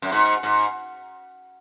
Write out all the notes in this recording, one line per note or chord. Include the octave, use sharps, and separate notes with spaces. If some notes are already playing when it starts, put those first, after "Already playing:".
F#2
G#2
G#2